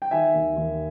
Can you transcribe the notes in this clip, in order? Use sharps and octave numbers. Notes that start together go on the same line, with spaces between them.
G5
D#3 E5 G#5
D#2
D#2